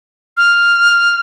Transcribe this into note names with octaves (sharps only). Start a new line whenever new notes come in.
F6